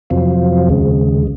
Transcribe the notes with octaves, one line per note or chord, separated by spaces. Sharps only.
F2 C3 F#3 C4 F4
D#2 C#3 G#3